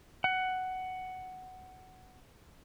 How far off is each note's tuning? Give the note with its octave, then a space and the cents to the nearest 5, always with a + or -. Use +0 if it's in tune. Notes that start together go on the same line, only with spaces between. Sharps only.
F#5 +10